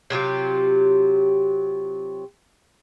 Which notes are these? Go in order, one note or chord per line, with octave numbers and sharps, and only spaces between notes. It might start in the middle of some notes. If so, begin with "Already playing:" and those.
C3 F#3 F4 G4